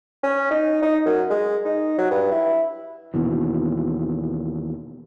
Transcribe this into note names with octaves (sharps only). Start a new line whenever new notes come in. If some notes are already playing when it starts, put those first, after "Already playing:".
C#4
D#4
D#4
F#2
G#3
D#4
F#3
G2
E4
D#2 B2 E3